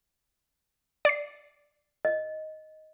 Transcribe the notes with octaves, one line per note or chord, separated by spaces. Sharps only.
D5 C7
D#5